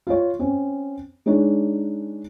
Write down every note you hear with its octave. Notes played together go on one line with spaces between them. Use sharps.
F4 C#5
C4 C#4
G#3 D4 D#4 C#5